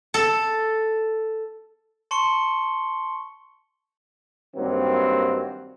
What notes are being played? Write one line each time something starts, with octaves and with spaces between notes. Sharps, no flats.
A4
A5 C6 C#6 C#7 G7
G2 D#3 F#3 A#3 C4